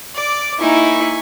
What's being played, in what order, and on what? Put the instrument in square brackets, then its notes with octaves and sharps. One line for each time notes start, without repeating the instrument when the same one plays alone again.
[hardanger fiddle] D5 D6
[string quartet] A#3 D#4 [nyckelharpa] E4 [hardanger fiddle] G#5 C#6